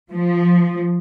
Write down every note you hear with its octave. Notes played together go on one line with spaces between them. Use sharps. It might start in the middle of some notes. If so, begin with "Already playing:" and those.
F3